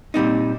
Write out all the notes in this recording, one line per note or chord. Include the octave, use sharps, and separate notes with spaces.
A#2 G3 C4 D#4